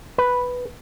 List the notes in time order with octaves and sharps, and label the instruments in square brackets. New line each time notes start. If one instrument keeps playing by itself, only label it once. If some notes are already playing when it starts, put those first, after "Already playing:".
[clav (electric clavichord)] B4